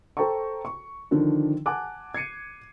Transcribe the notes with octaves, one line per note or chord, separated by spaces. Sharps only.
A4 C5 G5 A5 A#5 C#6
C#6
D3 D#3 F3 D4
F#5 G#5 A5 D6 F#6
G#6 C7 C#7 D#7